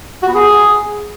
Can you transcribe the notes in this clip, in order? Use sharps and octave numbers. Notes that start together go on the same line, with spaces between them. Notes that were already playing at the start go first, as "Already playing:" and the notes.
F#4
B3
G#4